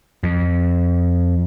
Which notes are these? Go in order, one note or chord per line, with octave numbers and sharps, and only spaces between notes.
F2